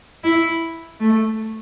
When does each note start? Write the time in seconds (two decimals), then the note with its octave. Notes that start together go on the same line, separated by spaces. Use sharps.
0.24 E4
1.00 A3